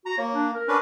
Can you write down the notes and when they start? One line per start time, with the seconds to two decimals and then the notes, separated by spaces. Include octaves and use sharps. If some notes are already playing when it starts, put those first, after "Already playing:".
0.06 F#4 A#5
0.18 A#3 C#5
0.35 D4
0.55 A#4
0.68 C#4 D4 B4